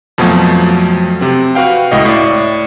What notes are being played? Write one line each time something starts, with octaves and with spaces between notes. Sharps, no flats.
F2 B2 F3 F#3 A3
C3 C4
F#4 B4 F5 G5
C#2 A2 D#5
A2 D5